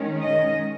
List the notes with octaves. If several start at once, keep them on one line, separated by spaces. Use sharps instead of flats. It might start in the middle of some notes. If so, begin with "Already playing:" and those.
Already playing: D#3 G#3 C#4
D#5